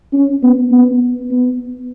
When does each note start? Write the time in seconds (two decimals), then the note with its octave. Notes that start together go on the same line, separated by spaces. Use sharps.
0.13 C#4
0.43 B3
0.71 B3
1.30 B3